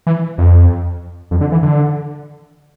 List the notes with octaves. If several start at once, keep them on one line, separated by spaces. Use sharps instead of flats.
E3
F2
F2
D3
E3
D3